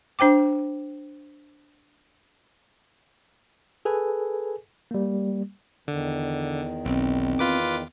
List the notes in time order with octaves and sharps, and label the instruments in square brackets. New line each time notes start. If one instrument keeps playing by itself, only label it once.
[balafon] D4 C5 G5 D6
[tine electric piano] G#4 A4 B4 G#5
G3 A#3
[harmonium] E2 D#3 [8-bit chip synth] D3
[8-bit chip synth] B1 [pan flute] C4
[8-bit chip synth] F4 B4 D6